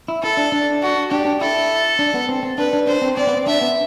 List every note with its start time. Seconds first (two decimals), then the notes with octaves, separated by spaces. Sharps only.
0.08 E4
0.23 E4 A4
0.37 D4
0.52 D4
0.82 F#4
1.11 D4 G4
1.25 D4
1.41 E4 A4
1.99 D4
2.14 B3
2.29 C4
2.43 C4
2.58 D4 B4
2.73 D4
2.87 D4 C5
3.02 C4
3.17 C4 D5
3.27 B3
3.37 C4
3.47 D4 E5
3.61 B3